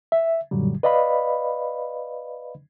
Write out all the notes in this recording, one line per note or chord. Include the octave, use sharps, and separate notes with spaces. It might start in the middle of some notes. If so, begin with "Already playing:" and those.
E5
F#2 A#2 D3 F#3 G3
B4 D5 D#5 F5 B5